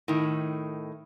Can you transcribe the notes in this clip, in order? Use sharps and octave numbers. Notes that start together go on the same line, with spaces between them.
A2 D#3